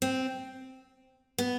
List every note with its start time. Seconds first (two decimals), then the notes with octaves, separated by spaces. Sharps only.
0.02 C4
1.38 B3